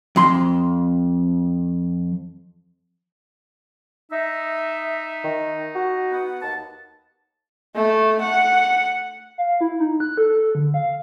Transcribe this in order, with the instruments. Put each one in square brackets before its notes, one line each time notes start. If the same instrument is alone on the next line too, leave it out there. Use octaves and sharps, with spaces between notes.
[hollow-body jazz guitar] F2 C6
[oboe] D#4 [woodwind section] E5
[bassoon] D#3
F#4
[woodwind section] B3 F#5
D#2 A5
[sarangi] A3
F#5
[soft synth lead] F5
E4
D#4
F#6
A4
D3
F5